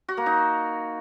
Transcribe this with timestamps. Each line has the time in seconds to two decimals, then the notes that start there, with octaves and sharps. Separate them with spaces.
0.08 F#4
0.17 A#3
0.26 D#4